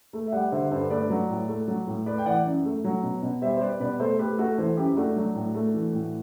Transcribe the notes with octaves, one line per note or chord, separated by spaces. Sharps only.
A3
E5
G3 D5 F#5
D3 C5 E5
G2 A4 C5
A3 B4 D5
F#3
A2
A3
F#3
A2
A3 B4 D5
G5
E3 D5 F#5
F#2
A3
F#3
B2
B2
G3 C5 E5
C5
G3 B4 D5
B2 B4 D5
A3 A4 C5
A3 G4 B4
A3 F#4 A4
E3 A4 C5
F#2 E4 G4
A3 D4 F#4
F#3
A2
A3
E3
A2